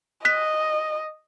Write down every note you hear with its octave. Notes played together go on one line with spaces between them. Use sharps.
D#5 F#6 B6